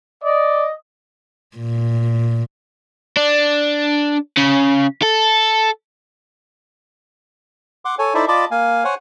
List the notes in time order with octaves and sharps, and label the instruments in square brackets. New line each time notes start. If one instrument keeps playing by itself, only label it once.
[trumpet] D5 [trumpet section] D#5
[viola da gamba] A#2
[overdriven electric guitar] D4
C#3
A4
[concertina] F#5 C6 D6
A4 C#5 G#5
D#4 E4 A4 C5 D5 E5
F4 D5 D#5 A5 B5 D6
A#3 F5 G#5
C5 C#5 F#5 G#5